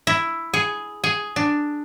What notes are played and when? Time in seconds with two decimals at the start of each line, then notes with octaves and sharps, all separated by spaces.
0.07 E4
0.54 G#4
1.04 G#4
1.36 D4